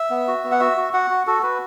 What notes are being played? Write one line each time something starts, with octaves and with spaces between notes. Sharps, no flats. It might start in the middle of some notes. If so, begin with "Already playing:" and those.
Already playing: E5
B3
F#4
B3
F#5
F#4 E5
F#4
F#4 F#5
F#4
F#4 A4
F#4 B4